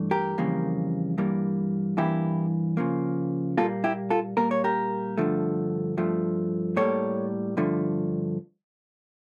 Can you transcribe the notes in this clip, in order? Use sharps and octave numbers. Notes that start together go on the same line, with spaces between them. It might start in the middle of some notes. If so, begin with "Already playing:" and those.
Already playing: G2 E3 A3
G4 A#4
F2 C#3 E3 G3 A#3
G2 E3 G3 A#3
G2 E3 A#3 E4 G4
C#3 F3 A#3
A#2 G3 A#3 F4 A4
E4 G4
F4 A4
A#2 G3 A#3 A#4
C#5
G4 A#4
G2 D3 F3 A3
G2 F3 A3
A2 G3 A#3 A4 C#5
G2 D3 F3 A3